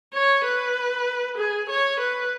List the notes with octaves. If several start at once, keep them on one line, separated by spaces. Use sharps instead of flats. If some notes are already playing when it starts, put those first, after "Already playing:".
C#5
B4
G#4
C#5
B4